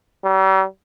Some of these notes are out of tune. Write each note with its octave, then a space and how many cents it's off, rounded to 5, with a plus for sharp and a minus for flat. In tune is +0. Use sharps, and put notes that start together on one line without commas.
G3 -45